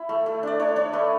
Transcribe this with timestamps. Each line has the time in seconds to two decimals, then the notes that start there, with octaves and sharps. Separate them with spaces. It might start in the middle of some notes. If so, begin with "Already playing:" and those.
Already playing: E4
0.09 A3
0.26 A3
0.43 D4 D5
0.59 D4 C#5
0.76 D4 C#5
0.93 A3 B4